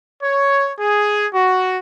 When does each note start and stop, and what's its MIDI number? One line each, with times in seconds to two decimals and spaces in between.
0.23 0.70 73
0.79 1.28 68
1.34 1.79 66